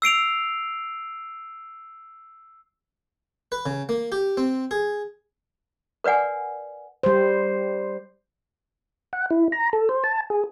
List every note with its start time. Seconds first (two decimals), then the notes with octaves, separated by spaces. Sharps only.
0.02 E6 C7 D7 F7
3.52 B4
3.66 C#3
3.89 A#3
4.12 G4
4.37 C4
4.71 G#4
6.04 A#4 B4 D5 F#5 G#5
7.03 G3 C5
9.13 F#5
9.31 E4
9.52 A#5
9.73 A4
9.89 C5
10.04 A5
10.30 G#4